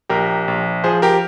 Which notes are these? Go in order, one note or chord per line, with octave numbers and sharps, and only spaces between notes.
A#1 G4 A#4
A#1
F3 G#4 C5
G4 A#4